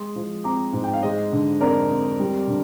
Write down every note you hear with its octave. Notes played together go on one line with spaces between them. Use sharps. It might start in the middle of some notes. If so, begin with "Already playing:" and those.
Already playing: G#3 C6 D#6
F3
C4 A#5 D6
G#2
G5
F5
G#3 C5 D#5
D3
F2 A#4 D5
F2
G3
D3